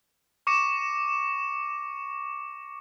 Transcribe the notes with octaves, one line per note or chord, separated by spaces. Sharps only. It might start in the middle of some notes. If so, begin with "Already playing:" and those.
C#6 D6 A#6 C#7 E7